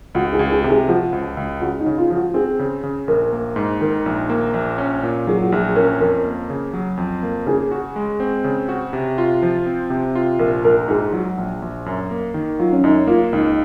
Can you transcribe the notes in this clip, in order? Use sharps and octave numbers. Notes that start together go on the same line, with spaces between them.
C#2 F#4
G#4
C#2
G#4
C3
G#4
F3 F#4
C#2
C#2
C#3 F#4
D#4
C#3
F4
F3
F#4
C4 G#4
C#3
C#3
A#1 A#4
A#3
G#2
D#3 A#4
A#1
A#3
A#1
C#4
A#2
F#3 G#4
F#4
A#1 G#4
C#4 A#4
F2 A#4
A#3
C#3
F#3
F2
A#3
C#3 G#4
F#4
G#3
C4
C#3
F#4
C3
F4
F3
C4
C3
F4
A#1 A#4
A#1 A#4
G#2 G#4
F#3 F#4
A#1
A#1
F#2
A#3
D#3
F#3 F4
C#4
F#2 D#4
A#3 F4
C#2 D#4